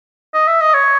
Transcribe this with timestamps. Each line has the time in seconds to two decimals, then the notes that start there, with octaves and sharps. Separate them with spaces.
0.34 D#5
0.47 E5
0.61 D#5
0.74 C#5